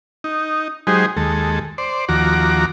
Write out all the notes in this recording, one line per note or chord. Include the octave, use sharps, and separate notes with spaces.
D#4
F#3 G#3 D#4 G4 G#4 C5
D#2 G#3 A4
C5 D5
D#2 F3 F#4 A#5 D6